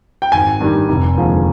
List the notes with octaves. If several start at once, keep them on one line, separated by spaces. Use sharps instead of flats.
G5
G#1 G#5
G2 D#3 G3
F1
D#2 D3 F3 G#3